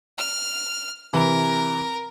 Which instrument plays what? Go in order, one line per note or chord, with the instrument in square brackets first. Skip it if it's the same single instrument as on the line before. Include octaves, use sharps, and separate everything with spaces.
[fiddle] F6
[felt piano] C3 E3 [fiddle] A#4